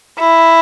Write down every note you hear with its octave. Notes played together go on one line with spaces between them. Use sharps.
E4